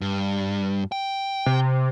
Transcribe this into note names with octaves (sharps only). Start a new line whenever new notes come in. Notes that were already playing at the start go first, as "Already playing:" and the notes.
G2
G5
C3